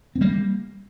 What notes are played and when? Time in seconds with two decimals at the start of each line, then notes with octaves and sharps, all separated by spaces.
0.15 C4
0.21 G3 A#3